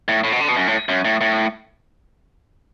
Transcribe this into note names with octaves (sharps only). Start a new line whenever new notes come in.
A2
A2
B2
D3
B2
F#2
A2
F#2
A2
A2